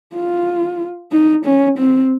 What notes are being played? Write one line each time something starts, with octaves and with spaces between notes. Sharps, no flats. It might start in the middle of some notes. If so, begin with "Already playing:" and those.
F4
D#4
C#4
C4